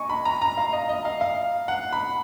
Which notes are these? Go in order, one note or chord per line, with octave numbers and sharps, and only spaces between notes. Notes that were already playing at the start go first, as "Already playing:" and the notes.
Already playing: D#5 G#5 C#6
B5
A#5
A#5
F5
D#5
D#5
F5
F5
F#5
B5